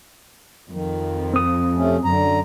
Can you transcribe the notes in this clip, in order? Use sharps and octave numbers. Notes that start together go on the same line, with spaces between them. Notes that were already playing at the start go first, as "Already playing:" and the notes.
F2 D#3
C4 D#6
C3 A3 C#4
F#2 D3 A#5